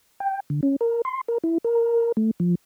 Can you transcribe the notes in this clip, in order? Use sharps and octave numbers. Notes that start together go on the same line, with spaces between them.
G5
D3
C#4
A#4
C6
A#4
E4
A#4
A3
F3